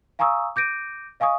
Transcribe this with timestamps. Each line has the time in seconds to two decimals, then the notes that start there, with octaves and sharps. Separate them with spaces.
0.19 F5 G#5 A#5 C#6 D#6 E6
0.56 D6 G6 A#6 D7 D#7
1.20 D#5 F5 G#5 C#6 D#6